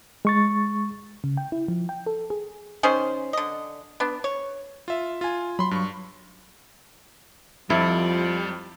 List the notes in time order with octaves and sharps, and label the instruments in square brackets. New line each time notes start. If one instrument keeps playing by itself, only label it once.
[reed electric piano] G#3 C#6 A6
[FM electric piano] C#3
G5
E4
F3
G5
A4
G#4
[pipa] D#3 C#4 G#4 C5
D3 D#5
B3 D4
C#5
[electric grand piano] F4 E5
F4 G#5
[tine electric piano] F#3 [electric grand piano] B5 C6
[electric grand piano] G2 C#6
[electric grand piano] F2 [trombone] F3 [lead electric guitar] G3 [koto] E4